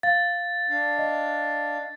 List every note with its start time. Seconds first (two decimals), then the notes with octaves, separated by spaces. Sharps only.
0.03 F5 A6
0.69 D4 F5
0.98 D#5